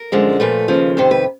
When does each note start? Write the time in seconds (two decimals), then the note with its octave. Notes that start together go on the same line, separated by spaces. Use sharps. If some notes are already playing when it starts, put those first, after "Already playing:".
Already playing: A#4
0.12 F#2 D3 F3 G#3
0.40 A#2 F3 A3 B4
0.68 D#2 C#3 F3
0.97 F2 C3 D#3 C5
1.11 B4